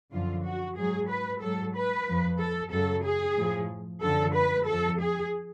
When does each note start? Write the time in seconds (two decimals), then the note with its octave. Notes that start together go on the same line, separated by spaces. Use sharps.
0.12 F#2 D3 F3 F4
0.44 F#4
0.76 G#2 F#3 G#4
1.09 B4
1.41 G#2 F#3 A4
1.75 B4
2.06 F2 F3
2.39 A4
2.71 F#2 C#3 F#3 A4
3.04 G#4
3.36 A2 F3
4.02 F#2 D3 F3 A4
4.34 B4
4.66 F2 F3 A4
5.00 G#4